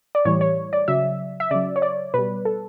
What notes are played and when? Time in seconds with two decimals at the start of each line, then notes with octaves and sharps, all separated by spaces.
0.15 D5
0.25 A2 E3 G3 C#5
0.41 C#5
0.73 D5
0.88 C#3 F#3 E5
1.40 E5
1.51 C#3 F#3 D5
1.76 C#5
1.82 D5
2.14 B2 G3 B4
2.45 A4